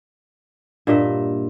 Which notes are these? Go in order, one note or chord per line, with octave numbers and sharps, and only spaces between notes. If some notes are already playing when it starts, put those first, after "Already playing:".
G2 A#2 D#5 E5